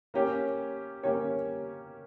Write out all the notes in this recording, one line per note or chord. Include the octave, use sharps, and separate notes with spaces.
A#3 C#4 G4 C#5
A#3 C#4 G4 C#5